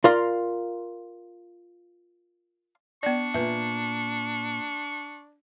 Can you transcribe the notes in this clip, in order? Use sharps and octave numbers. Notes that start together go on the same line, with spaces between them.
F4 A#4 D5 F5 C6
B3 D4 D5 C#6
A#2 B4 E5